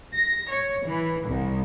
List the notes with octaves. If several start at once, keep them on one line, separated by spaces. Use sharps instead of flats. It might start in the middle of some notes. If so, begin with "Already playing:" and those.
A#6
C#5
E3
C2